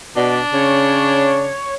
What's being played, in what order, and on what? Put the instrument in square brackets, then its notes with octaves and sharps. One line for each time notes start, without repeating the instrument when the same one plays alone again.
[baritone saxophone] B2 [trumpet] D4 [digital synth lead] D5
[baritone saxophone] C#3 [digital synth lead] C#5